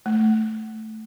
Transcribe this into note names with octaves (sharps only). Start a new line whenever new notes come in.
A3